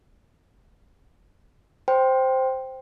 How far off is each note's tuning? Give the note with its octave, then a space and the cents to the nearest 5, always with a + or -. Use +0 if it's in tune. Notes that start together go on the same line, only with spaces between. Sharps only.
C5 +0 G5 +0